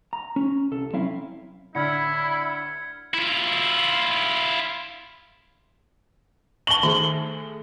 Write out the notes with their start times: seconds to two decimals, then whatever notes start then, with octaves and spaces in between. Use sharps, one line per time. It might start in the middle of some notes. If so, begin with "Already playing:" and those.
0.13 A#5
0.36 C#4
0.71 C2 A4
0.93 F#3 C4 C#4 E4 F5
1.75 A2 D3 E4 B5 F6 G#6 C#7
3.14 E4 F4
6.67 A5 C#6 F#7 G7
6.83 D#3 A3 G#4